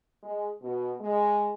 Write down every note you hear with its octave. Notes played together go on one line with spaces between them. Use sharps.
G#3
B2
G#3